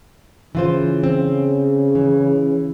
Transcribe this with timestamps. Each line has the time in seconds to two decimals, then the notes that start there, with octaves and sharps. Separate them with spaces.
0.55 C#3 E3 F4 C5
1.03 C4
1.95 E3